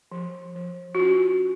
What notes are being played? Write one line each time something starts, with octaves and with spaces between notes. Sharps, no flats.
F3
F3
F#4
C#4 F4